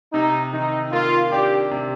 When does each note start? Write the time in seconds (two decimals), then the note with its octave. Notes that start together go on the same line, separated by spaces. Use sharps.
0.13 C3 D#4
0.53 D#3 D#4
0.92 A#3 F4
1.32 D4 G4
1.71 C3